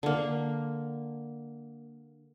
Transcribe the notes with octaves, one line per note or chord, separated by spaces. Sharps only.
D3 A#3